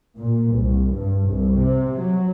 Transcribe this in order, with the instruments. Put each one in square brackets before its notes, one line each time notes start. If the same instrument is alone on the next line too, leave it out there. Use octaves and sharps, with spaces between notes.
[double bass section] A#2
C2
G2
C2
C3
F#3